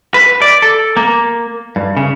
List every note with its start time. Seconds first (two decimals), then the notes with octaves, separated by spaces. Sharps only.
0.14 B4
0.42 D5
0.62 A4
0.97 A#3
1.76 G2
1.97 C#3